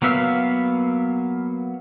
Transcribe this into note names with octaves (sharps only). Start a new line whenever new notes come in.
F#3 A#3 B3 E5 F5